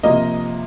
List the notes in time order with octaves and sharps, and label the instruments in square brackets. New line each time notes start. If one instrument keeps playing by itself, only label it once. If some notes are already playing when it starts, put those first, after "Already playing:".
[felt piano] C3 F3 A#3 D#5